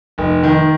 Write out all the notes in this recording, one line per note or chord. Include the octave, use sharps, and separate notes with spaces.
F1
D#3